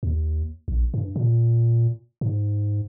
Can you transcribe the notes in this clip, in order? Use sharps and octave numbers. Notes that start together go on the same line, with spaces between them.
D#2
A#1
G2
A#2
G#2